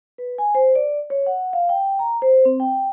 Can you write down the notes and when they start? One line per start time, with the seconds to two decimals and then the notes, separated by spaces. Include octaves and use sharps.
0.18 B4
0.38 G#5
0.55 C5
0.75 D5
1.10 C#5
1.26 F#5
1.53 F5
1.69 G5
1.99 A#5
2.22 C5
2.45 C4
2.60 G5